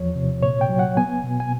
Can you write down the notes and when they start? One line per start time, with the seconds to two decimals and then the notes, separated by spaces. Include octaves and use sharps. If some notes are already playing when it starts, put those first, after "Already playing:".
Already playing: E2 F3 C#5
0.15 C3
0.43 A#2 C#5
0.61 G5
0.69 F#3
0.79 F#5
0.97 B3 G#5
1.24 B2
1.40 G#5